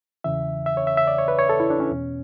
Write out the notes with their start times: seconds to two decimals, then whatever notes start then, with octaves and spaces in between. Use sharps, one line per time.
0.24 E2 C#3 E3 E5
0.66 E5
0.77 C#5
0.87 E5
0.97 E5
1.07 D5
1.18 C#5
1.28 B4
1.39 C#5
1.49 A4
1.60 E4
1.70 D4
1.80 C#4
1.91 E2 B2